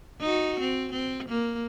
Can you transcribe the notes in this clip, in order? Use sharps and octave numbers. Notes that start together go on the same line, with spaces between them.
D#4 F#4
C4
C4
A#3